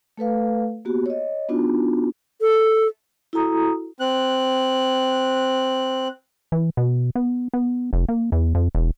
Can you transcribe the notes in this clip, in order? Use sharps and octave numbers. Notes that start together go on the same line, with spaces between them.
A3 A4 B4 F5
A#3 B3 F#4 G4
C#5 D#5
B3 D4 D#4 F4 F#4
A4
E4 F#4 A4 A#5 D#6
C4 F#6
E3
B2
B3
B3
F1
A#3
E2
F2
E1